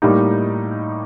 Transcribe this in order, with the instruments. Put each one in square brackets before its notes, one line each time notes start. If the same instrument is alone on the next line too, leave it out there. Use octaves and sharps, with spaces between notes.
[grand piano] A2 G3 A#3 D#4 G4